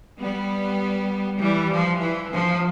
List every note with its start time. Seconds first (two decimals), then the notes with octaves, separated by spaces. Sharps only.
0.19 G3 B3
1.40 E3 G3
1.70 F3
2.00 E3
2.30 F3